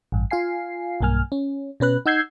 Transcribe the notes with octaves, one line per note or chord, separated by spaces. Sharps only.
A1 G2
F4 F5 G#5 C7
B1 G2 A#3 G#5 F6
C#4
B2 C#4 B4 F#6
D#4 F#5 E6 G6 G#6 C7